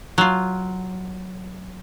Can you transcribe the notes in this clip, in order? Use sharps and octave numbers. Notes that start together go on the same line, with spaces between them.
F#3 F4